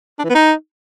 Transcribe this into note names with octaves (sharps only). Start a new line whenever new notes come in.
D4
E3
B3
D#4